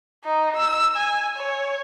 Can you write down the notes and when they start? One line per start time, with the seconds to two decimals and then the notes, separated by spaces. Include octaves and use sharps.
0.24 D#4
0.57 E6
0.97 G#5
1.37 C#5